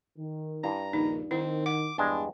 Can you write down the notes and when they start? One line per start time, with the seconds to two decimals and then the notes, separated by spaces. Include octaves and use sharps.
0.17 D#3
0.64 G2 E4 A#5
0.93 A#1 D#2 D#3 D#4
1.31 D#3 C4 E4
1.66 F#5 D6
1.98 E2 G2 G#3 D4